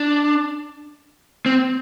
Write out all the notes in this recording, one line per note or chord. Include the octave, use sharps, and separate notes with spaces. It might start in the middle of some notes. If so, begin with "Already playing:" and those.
Already playing: D4
C4